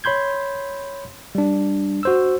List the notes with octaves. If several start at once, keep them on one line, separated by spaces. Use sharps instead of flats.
C#5 B5 C6 G6 G#6
G3 D4
F#4 C5 E6